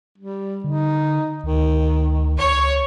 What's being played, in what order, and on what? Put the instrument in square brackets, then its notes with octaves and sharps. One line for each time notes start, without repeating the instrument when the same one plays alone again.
[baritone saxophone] G3
[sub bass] D3 [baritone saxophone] D#4
[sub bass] D2 [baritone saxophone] D#3
[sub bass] C#2 [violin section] C#5